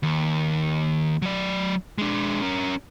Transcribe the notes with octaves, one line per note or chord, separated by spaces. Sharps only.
D#2
F#3 D5
G#3 D4
C#4 A#4